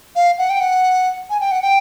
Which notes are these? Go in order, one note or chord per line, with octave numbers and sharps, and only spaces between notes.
F5
F#5
G5
F#5
G#5
G5
F#5
G5